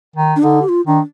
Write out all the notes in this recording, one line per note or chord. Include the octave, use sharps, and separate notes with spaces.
D#3
D4
D3 D#4
G4
F4
D#3 D4